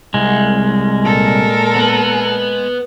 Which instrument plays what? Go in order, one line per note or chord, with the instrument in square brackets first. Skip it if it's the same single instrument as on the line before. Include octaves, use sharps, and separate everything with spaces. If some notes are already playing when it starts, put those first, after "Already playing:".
[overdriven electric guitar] C2 [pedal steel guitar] G#3
[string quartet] A#2 A4 A#4
[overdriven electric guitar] B3